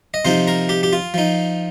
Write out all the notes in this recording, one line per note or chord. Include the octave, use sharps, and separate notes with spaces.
D#5
C3 F3 D#4 C5
A#4
G4
G4
F4
F3 D#4